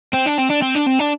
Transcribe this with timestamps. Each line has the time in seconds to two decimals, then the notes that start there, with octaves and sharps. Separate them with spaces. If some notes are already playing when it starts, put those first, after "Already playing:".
0.14 C4
0.27 D4
0.39 C4
0.50 D4
0.62 C4
0.75 D4
0.87 C4
0.99 D4